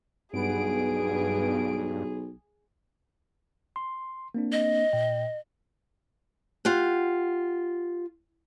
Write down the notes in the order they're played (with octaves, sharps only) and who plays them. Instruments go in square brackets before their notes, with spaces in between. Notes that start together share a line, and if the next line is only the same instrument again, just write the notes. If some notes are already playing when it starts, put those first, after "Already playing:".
[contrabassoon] B1 [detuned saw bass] G2 [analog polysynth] B3 D7 [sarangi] G#4
[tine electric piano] C6
A#3 C4 D4
[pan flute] D#5
[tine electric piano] A#2 G5
[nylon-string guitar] F4 G4 F#5